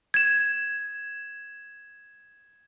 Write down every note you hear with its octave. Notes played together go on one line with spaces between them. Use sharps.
G#6 E7